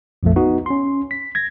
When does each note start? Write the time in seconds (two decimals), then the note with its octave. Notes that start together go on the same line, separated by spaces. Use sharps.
0.23 A#1 F2 F3 A3
0.36 B3 D#4 F#4
0.66 C#4 C6
1.11 B6
1.35 G#6 A#6